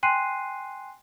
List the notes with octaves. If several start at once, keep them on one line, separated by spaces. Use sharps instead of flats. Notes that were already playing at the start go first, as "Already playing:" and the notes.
G5 G#5 C6 F#6 C7 D#7